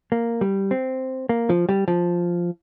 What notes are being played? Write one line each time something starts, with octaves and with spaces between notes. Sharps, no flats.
A#3
G3
C4
A#3
F3
G3
F3